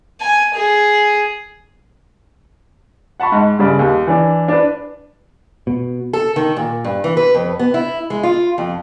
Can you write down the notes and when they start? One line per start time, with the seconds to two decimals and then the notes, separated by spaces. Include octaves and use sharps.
0.21 G#5
0.54 G#4
3.20 F#5 A5 B5 C#6
3.32 G#2
3.59 G2 C#3 D5
3.79 D#2
4.07 E3 D4
4.48 D4 B4
5.67 B2
6.13 A4
6.36 D#3
6.56 A#2
6.84 G2
7.04 E3
7.17 B4
7.34 F2
7.59 B3
7.74 E4
8.10 G#3
8.23 F4
8.58 F2